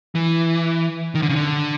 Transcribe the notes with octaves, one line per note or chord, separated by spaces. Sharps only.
E3
D#3
D3
C#3
D3